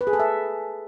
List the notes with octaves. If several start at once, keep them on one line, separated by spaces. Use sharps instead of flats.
B4
G#4
A4
E5